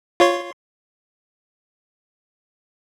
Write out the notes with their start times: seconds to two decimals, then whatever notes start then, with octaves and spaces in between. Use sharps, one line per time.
0.20 F4 C#5 C6